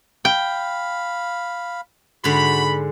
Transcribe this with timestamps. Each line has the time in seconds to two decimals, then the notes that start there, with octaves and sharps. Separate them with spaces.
0.25 F5 G5 B5
2.24 G#2 D3 F#4 B5